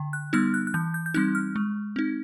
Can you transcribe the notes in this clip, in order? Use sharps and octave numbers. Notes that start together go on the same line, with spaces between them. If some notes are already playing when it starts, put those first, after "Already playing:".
Already playing: D3
F#6
G3 B3 D#4 F6
F#6
F#6
E3 G6
G6
G6
G3 C4 D#4 F#6
F6
G#3
C4 D#4